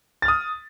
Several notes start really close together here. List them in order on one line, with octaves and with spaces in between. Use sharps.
A6 F6 D#6